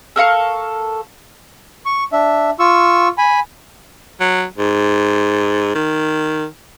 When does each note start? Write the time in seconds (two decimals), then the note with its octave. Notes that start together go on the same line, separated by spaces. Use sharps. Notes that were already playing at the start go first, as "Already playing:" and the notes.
0.16 A4 A#4 F5 C#6
1.86 C#6
2.13 D4 E5
2.59 F4 C#6 E6
3.18 G#5 B5
4.20 F#3
4.58 G#2
5.75 D#3